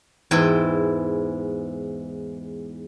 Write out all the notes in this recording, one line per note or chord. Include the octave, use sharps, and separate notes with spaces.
E2 G#2 E4 G5 C6